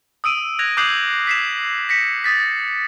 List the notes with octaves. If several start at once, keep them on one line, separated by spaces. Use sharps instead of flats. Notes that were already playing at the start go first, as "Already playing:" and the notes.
D#6 E6 D7 D#7
F#6 G#6 A#6 F7
D6 D#6 F#6 G6 C7 F#7
B6 C7 E7
A#6 B6 C#7
D#6 A6 B6